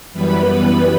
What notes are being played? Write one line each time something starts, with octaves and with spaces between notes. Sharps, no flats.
F#2 E3 G3 B3 B4 B5